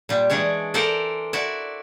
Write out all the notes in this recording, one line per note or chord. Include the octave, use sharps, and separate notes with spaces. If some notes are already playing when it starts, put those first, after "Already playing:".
A#2 G3
E3 G#3 D4 C#5
A4 A#4 C5 D5 E5
E4 F#4 D5 E5